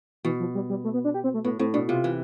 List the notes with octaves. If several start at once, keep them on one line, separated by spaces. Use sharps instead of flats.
B2 E3
F3
G3
G3
A3
B3
D4
G4
C4
A3
A2 B3
A2 C4
B2 D4
C3 F4
E3